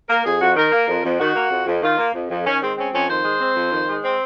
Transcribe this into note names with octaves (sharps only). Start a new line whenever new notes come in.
A#3 A#4
F2 G#4
F2 F#4
D#3 A#4
A#3
F2
F2
D#3 F#4
A#3
F2
F2
D#3 F4
A#3
F2
F2
D#3 C#4
G#3 C4
C4 C#4
F2 C#4
D#3 C5
G#3
C4
F2
D#3
G#3
C4